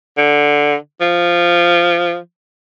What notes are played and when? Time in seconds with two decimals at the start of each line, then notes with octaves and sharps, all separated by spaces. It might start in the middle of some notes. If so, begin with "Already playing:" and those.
0.17 D3
1.01 F3